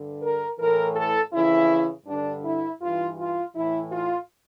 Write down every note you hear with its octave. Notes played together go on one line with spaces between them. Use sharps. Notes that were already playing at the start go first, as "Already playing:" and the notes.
Already playing: G2 D3
A#4
A2 E3 A#4
A4
F2 C#3 E3 E4
G2 D3 D4
E4
G2 E3 F4
F4
A2 E3 E4
F4